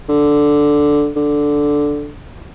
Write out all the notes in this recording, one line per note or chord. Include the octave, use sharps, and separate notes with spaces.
D3
D3